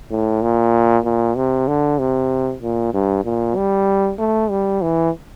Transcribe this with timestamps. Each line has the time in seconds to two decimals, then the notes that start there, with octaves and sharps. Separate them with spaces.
0.11 A2
0.42 A#2
1.05 A#2
1.37 C3
1.68 D3
1.99 C3
2.62 A#2
2.94 G2
3.25 A#2
3.56 G3
4.19 A3
4.50 G3
4.82 E3